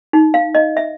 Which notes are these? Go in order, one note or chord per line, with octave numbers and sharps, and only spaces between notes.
D#4
F5
D#5
E5